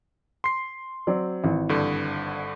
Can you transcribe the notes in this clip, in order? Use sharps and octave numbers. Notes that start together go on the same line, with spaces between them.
C6 C7
F#3 C4 D5
G#1 E3
G2 D3